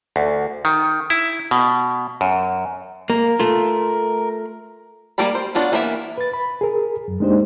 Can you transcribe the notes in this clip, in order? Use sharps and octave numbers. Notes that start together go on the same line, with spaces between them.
D2
D#3
E4
B2
F#2
A#3 A#4
A3 F4
G3 A#3 A#4 A5 B5
C5
F#3 B3 D4 F4 F#4
E3 A#3 B3 D4 E5
B4 A6
B5
G#4 A#4
F#2
G#3 A#3 D4 D#4 G4 C5